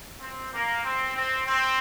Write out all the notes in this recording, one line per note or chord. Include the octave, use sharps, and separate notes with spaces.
C4
A#3
C4
C4
C4